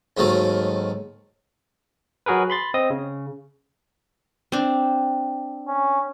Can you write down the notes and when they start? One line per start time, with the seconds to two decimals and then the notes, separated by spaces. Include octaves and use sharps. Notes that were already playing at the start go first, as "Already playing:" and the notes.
0.17 D#2 G#2 D#3 F#3 A3
2.26 F#3 F#4 G#4 A#4 B4
2.50 B5 C6 A6
2.74 C4 D#5 D#6
2.90 C#3
4.52 C4 D4
5.68 C#4